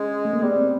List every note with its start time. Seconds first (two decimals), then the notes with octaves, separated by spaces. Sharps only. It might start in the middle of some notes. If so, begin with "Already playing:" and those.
Already playing: G#3 C#4
0.25 A3
0.33 A#3
0.42 G3 B3
0.56 C4